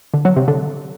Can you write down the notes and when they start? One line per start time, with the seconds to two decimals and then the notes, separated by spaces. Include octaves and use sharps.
0.14 D3
0.25 F#3
0.36 C3
0.48 D3